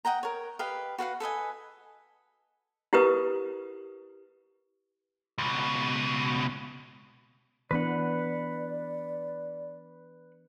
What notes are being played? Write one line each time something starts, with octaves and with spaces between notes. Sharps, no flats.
D#5 F#5 G5 A#5
A#4 C#5
G4 B4 D#5 F5
F#4 B4 F5 F#5
A4 B4 D#5 G#5
E4 G4 A#4 B4 D#6
C#2 B2
E3 B3 D4 B4 D5 F#5